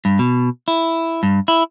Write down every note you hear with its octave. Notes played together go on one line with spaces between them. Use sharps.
G2
B2
E4
G2
E4